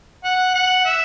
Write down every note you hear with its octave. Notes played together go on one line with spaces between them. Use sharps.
F#5
F#5
E5